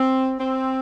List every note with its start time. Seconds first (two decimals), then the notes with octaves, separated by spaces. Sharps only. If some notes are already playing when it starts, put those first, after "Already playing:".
Already playing: C4
0.39 C4